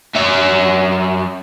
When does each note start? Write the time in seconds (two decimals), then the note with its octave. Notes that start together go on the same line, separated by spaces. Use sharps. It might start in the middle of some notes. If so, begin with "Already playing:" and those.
0.15 F#2 E5